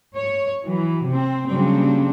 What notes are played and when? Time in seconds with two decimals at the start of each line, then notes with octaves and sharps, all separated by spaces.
0.16 C#5
0.66 E3 F#3
1.05 C3 C4
1.46 C#3 F#3 G3 A#3 C4 D4